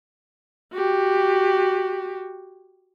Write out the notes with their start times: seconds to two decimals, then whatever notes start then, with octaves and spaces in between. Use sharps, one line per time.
0.72 F#4 G4